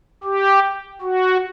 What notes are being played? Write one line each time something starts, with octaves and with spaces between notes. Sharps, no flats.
G4
F#4